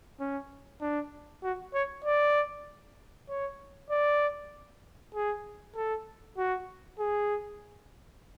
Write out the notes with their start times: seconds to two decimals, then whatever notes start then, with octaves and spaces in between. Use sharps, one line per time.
0.20 C#4
0.81 D4
1.43 F#4
1.74 C#5
2.05 D5
3.29 C#5
3.91 D5
5.15 G#4
5.76 A4
6.38 F#4
6.99 G#4